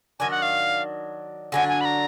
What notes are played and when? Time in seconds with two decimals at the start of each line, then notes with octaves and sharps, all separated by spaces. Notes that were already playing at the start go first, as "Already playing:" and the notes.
0.20 D#3 F#3 D4 G#5
0.31 F#5
0.42 F5
1.52 D3 F#3 D4 G#5
1.69 G#5
1.81 B5
1.85 A#5